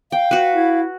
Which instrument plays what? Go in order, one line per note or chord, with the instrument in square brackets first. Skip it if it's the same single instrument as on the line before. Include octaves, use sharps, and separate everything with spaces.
[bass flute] F5 [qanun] G5
[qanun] F#4 B4
[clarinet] E4